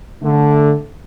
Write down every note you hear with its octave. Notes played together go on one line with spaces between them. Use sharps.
D3 A3